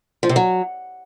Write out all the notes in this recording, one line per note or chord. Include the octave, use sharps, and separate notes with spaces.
F3
C3
F#3